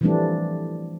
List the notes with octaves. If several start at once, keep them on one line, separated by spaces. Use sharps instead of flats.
E3 F3 G3 A3 C4 D4